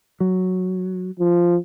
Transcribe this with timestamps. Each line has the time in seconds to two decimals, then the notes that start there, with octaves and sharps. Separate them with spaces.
0.20 F#3
1.20 F3